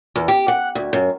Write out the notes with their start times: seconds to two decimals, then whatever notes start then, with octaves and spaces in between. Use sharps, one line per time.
0.16 E2
0.28 G4
0.48 F#5
0.75 D2
0.93 F#2